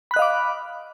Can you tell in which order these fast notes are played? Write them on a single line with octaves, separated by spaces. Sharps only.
B5 F#6 D#5 F5 D6